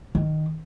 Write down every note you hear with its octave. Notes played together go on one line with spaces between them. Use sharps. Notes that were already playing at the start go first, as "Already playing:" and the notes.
D#3